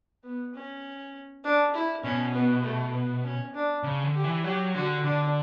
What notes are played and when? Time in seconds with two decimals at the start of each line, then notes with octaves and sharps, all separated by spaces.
0.24 B3
0.54 C#4
1.44 D4
1.74 E4
2.04 B2 C#4
2.34 B3
2.64 A3
2.94 B3
3.24 C#4
3.54 D4
3.83 C#3
4.04 D3
4.14 G4
4.24 E3
4.44 F#3 G4
4.74 D3 F#4
5.04 D3 D4